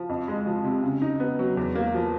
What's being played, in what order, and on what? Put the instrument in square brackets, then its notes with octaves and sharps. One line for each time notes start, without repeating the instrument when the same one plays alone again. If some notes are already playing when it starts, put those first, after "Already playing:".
Already playing: [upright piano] F3
F2
G#3
F3
C3
C#3
D#4
B3
F#3
E2
A#3
F3